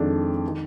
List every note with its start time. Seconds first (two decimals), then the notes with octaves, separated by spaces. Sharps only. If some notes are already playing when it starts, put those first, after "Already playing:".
Already playing: F2 D#3 G#3 D4
0.47 D#3